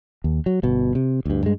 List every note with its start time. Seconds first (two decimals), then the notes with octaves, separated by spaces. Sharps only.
0.24 D#2
0.46 F#3
0.63 G1 B2
0.95 C3
1.25 D2 G2
1.43 G2 G#3